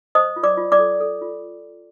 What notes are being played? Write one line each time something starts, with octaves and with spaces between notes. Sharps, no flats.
C5 D#5 D#6
F4
D5 D6
F4
D5 D6
A4
A4
F4